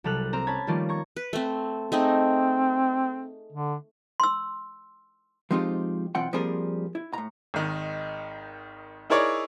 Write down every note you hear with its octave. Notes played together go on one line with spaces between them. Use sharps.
C2 F#3 G3 A4 F6 F#6
C4 A#5 F6
C#4 A5 B5 G#6
D#3 F3 G3 A3 A#3 F4
A#5 C#6 G#6
B4
A3 C4
A3 C4 D#4 G#4
D3
C6 E6
F3 G#3 C4 D#4 F4 G4
B1 E3 C4 F4 F#5 G5
F3 G3 A#3 C4 G#4 A#4
E4
A2 A#5
G#1 D#3 D#4
D#4 E4 G#4 A#4 C#5 D5